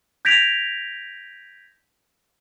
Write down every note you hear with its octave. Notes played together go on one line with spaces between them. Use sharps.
G6 G#6 A#6 B6 D7 F7